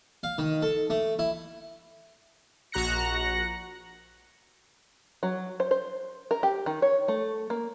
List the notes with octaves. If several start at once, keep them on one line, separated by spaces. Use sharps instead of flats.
F5
D#3
A4
A3
E4
A#1 F#4 A#5 F#6 A#6 C#7
F#3
C5
C5
A#4
G4
D#3
C#5
A3
A#3